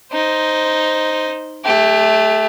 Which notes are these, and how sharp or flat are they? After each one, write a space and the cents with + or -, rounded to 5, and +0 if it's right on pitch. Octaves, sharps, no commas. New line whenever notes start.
D#4 +0 C5 +0
A3 -10 G4 +30